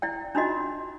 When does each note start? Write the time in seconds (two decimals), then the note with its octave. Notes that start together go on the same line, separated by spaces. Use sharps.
0.02 E4 D5 G5
0.35 D4 D#4 F4 F#4 D#5